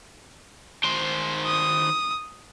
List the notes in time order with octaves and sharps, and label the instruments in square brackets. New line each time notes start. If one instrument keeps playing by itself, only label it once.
[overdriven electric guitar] D#3 C5
[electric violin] D#6